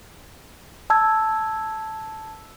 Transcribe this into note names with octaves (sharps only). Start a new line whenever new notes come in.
A5 E6 G#6